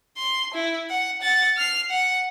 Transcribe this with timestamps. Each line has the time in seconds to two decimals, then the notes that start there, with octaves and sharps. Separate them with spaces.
0.17 C6
0.54 E4
0.90 F#5
1.22 F#5 A6
1.57 F6 C7
1.90 F#5